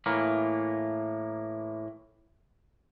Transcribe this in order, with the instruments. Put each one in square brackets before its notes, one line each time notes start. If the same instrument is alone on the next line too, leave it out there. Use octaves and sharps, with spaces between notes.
[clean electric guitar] A2 E3 A#3